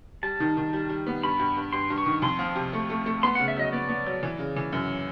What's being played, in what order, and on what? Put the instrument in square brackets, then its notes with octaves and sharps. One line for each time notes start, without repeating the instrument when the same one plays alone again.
[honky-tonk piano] G3 [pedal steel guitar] A5
[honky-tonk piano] D#3
D#3
G3
G3
B3
[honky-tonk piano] G2 [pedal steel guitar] B5
[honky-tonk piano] G2
G2
[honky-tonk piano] G2 [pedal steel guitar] C6
[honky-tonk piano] G2
[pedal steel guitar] C#6
[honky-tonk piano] D#3
[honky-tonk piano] F2 [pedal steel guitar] C6
[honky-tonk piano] F3
C3
A3
A3
A3
[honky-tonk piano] B3 [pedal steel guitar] C6
[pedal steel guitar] F#5
[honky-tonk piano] C#3
[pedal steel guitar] E5
[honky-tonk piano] F#3 [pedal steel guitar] D#5
[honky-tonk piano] B3 [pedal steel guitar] D5
[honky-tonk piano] B3
F#3
E3
C#3
E3
F#2